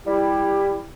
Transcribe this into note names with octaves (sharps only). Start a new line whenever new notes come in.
G3 E4 G4